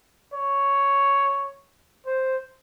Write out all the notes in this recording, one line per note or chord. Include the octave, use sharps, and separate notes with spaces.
C#5
C5